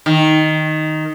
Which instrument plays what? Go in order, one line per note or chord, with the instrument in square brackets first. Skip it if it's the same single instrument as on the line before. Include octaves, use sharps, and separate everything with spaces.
[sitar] D#3